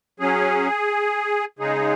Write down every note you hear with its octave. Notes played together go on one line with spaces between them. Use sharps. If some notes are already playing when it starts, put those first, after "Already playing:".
F#3 C#4 G#4
C#3 G#3 D#4 G#4